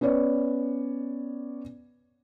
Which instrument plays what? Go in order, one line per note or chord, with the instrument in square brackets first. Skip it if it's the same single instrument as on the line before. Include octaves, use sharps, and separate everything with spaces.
[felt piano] B3 C#4 B4 C#5 D5